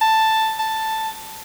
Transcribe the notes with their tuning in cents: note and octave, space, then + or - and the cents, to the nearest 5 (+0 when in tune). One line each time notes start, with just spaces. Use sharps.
A5 +5
A5 +5